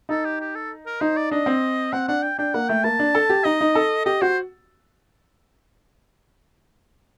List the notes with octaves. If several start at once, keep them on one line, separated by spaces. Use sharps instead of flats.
D#4 A4
G4
G4
A4
A#4
D#4 C5
D5
D4 D#5
C4
C4 F#5
D4 F#5
G5
D4 G5
A#3 F#5
A3 G5
A#3 A5
D4
A4
G4
D#4 D#5
D#4
A4
G4 D#5
F#4 C5